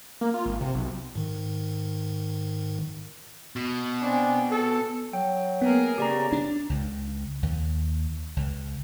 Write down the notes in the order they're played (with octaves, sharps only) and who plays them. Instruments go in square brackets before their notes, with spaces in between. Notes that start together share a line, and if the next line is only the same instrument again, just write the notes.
[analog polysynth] A#3
F4
G#1
C3
B1
[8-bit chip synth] G#2 D#3
[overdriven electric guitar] B2
[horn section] C4 D4 G#5
A4
[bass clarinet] F#3 [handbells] G5
[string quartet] A#3 G#4 A#4 [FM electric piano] B3
[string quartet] C#3 [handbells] G4 D5 A#5
[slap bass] D4
C#2
D#2
C#2